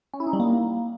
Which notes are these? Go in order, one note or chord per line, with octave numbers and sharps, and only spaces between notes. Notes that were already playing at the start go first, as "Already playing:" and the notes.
C#4
E4
D#4
G3
A#3